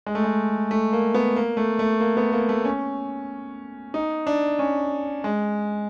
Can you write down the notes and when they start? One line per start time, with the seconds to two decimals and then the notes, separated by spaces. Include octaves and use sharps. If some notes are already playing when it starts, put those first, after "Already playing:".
0.06 G#3
0.15 A3
0.24 G#3
0.71 A3
0.93 A#3
1.14 B3
1.36 A#3
1.57 A3
1.79 A3
2.00 A#3
2.17 B3
2.32 A#3
2.49 A3
2.65 C#4
3.94 D#4
4.27 D4
4.59 C#4
5.24 G#3